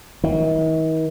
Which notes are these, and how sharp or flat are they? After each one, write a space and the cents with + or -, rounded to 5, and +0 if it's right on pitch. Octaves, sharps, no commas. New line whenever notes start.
D#3 +45